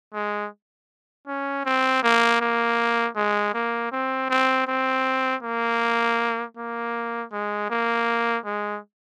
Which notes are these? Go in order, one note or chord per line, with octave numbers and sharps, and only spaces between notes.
G#3
C#4
C4
A#3
A#3
G#3
A#3
C4
C4
C4
A#3
A#3
G#3
A#3
G#3